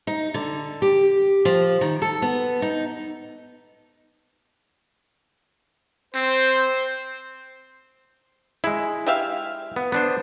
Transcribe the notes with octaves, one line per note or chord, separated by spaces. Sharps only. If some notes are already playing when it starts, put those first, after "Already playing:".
D#4
D3
G4
F3
D#3
A4
B3
D#4
C4 C5
G#3 E4 G#4
G4 E5 F5
B3
B3 D4 C5